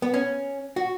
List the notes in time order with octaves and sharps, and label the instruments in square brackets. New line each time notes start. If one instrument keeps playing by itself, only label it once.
[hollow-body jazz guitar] B3
C#4
F#4